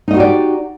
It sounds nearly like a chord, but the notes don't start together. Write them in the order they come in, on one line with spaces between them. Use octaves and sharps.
D#4 D#5 F#4 G4 D5